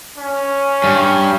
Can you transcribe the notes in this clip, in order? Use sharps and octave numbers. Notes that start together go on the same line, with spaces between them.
C#4
G2